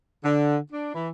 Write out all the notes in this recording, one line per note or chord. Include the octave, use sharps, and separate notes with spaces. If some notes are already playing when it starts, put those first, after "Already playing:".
D3
D4
E3